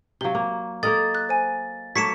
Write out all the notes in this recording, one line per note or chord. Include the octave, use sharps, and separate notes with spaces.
C3 F#3 F5 G7
A#3
A#3 A4 A#4 D#5 A6
F#6
C5 G#5
F#3 A3 A#3 C#6 G#6 B6 C#7 E7